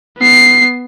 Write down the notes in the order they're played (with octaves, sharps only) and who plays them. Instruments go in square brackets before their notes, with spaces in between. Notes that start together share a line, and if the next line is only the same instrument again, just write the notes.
[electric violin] B3 C7